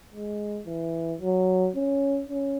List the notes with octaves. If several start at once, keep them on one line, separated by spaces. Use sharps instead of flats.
G#3
E3
F#3
C#4
C#4